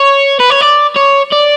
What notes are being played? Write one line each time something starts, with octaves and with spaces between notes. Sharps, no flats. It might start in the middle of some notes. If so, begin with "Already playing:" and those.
Already playing: C#5
B4
C#5
D5
C#5
D5